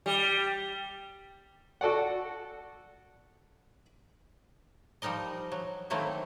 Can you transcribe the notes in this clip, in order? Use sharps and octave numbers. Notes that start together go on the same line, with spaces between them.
G3
F#4 A4 D5 F#5
F3 G3 D#4 A#4 D#5
F#3
D#3 F#3 A3 A#3 C4 E4